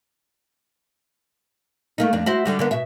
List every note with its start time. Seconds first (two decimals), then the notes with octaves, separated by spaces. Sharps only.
1.98 A3 A#3 D#4
2.13 F2 D4
2.26 E4 F#4 C5
2.45 D3 G3 F#4
2.59 D3 A#3 B3
2.71 B2 E5